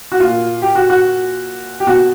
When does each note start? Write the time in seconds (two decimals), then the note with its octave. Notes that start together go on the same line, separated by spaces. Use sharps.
0.12 F#4
0.20 A#2 F4
0.62 G4
0.75 F#4
0.90 F#4
1.80 G4
1.87 B2 F#4